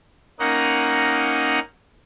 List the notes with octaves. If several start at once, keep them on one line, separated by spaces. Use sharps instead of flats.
A#3 C#4 D#4 A#4 D#5 F#5